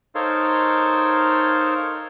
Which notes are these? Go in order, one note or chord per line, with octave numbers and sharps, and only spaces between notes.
D#4 A4 A#4 C5 C#5 F5